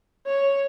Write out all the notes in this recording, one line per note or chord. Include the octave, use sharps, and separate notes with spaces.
C#5